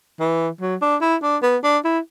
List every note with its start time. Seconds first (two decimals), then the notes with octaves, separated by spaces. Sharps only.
0.20 E3
0.61 F#3
0.82 D4
1.01 E4
1.23 D4
1.43 B3
1.64 D4
1.85 E4